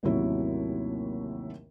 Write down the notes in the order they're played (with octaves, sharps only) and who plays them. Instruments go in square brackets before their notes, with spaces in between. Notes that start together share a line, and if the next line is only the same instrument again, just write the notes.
[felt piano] A1 D#2 C3 F#3 E4 C#5